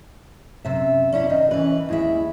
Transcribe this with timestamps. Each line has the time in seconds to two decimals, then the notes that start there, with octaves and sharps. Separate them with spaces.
0.65 F#2 C3 E5
1.12 C#4 D4 E4 D5
1.30 D#3 D#5
1.51 E3 C#4 B4
1.89 D#2 G#3 E4 E5